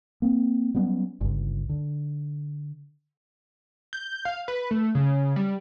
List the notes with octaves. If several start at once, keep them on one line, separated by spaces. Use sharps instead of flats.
A#3 C4
F#3 G3 B3 C#4
G1 C#2
D3
G6
F5
B4
A3
C#3
G3